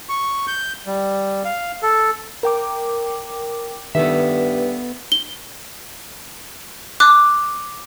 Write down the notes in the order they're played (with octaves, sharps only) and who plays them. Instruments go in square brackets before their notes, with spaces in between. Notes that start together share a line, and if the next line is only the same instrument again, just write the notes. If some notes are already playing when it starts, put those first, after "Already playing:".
[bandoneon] C#6
G6
G3
F5
A4
[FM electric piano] A#4 G5 D6
[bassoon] G2 [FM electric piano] D#3 [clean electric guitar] B3 A4 E5
[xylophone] G7
D6 F#6